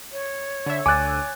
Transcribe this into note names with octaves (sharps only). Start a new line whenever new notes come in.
C#5
D3 E5
D2 G#5 D6 E6 F#6 A6 D#7